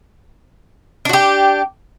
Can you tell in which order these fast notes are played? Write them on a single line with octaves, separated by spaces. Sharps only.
D4 F#4 G4